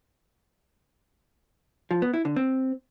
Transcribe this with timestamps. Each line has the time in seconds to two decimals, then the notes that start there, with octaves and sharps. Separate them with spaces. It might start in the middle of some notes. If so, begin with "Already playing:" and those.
1.91 F3
2.02 B3
2.14 E4
2.25 D3
2.36 C4